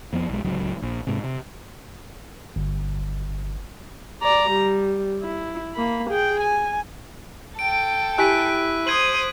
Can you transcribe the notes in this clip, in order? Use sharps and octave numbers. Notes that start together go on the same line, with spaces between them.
F2 F3 B3
B1 G#3
D1 C#2 F#3
A#1
G#2 C3
C3
G1
D5 A#5
G3
E4
A#3 B5
G#4 G5
G#5
A4 G5 D7
E4 G4 G#5 F#6 B6 D#7
C5 D#6 G#6 D#7 F#7